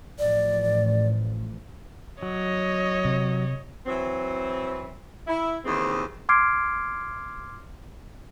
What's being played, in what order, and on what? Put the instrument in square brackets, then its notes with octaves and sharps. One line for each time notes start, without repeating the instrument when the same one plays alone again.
[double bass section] A1 F3 [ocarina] D5
[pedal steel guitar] F#3 [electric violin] C#5 D#5
[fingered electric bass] C3
[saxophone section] E3 F#3 C4
E4
D#2 G#2 C#3 E3 C4
[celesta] C6 D6 F6 G#6 C7 D7